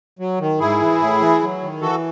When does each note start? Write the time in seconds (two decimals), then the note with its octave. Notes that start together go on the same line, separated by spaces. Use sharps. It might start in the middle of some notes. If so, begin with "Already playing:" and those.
0.19 F#3
0.40 D#3
0.60 G#2 E4 G#4
0.81 E3
1.00 A2
1.21 E3
1.41 F#3
1.61 D#3
1.81 E3 F#4 A4